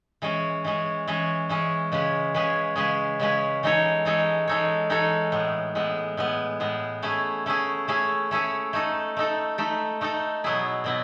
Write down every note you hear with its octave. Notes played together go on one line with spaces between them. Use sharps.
E3 G#3 C#4
E3 G#3 C#4
E3 G#3 C#4
E3 G#3 C#4
C#3 G#3 C#4 G#4 B4
C#3 G#3 C#4 G#4 B4
C#3 G#3 C#4 G#4 B4
C#3 G#3 C#4 G#4 B4
E3 G#3 D#4 A4 C#5
E3 G#3 D#4 A4 C#5
E3 G#3 D#4 A4 C#5
E3 G#3 D#4 A4 C#5
A2 G#3 B3
A2 G#3 B3
A2 G#3 B3
A2 G#3 B3
A3 C#4 E4 G#4
A3 C#4 E4 G#4
A3 C#4 E4 G#4
A3 C#4 E4 G#4
A3 D#4 A4
A3 D#4 A4
A3 D#4 A4
A3 D#4 A4
B2 F#3 B3 E4 G#4
B2 F#3 B3 E4